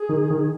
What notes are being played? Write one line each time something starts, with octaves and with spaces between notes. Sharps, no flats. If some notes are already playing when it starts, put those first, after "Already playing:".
Already playing: G#4
D#3
D#3